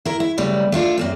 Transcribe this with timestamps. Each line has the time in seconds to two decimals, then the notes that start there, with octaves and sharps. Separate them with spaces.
0.05 E4 A#4
0.20 E4
0.38 F#2 C#3 G3 A3 B4 D5
0.72 A3 D4 F4
0.97 F#2 A#3 C4